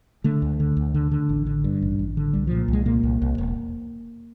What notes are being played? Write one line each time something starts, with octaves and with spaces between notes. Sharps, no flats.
D3 A3
D2
D3
D2
D3
D3
A1
D3
G2
A1
A1
D3
C2 G3
A#2 F3
C2 G#3
A#2 A#3
C2
C2
E1